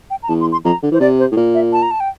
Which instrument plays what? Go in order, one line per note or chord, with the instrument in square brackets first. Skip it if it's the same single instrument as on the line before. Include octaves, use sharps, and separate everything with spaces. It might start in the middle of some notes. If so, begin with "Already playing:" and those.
[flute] G5
A#5
[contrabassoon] E2 [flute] A5
[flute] C6
C6
[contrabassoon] F2 [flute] A#5
[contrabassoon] D3
[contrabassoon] E3 [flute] C5
[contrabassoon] C3 [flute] D5
[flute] C5
[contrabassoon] A2
A#2
[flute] E5
A5
A#5
A5
G5